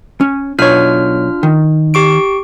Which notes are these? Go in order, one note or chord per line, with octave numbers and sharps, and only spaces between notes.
C#4
B1 D4 F4 C#5 F6
D#3
G4 C#6 D7